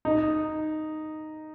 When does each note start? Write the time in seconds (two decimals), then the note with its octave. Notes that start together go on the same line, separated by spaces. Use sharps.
0.05 D#4